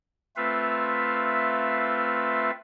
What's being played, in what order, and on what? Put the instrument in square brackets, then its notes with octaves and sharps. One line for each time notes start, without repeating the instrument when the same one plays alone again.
[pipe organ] A3 C4 F4 B4 E5 F5